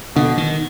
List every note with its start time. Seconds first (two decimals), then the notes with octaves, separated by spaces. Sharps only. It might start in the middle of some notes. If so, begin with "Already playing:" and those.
0.16 B2 D3
0.38 D#3